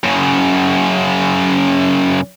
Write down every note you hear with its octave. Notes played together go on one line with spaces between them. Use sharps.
F#2 C#3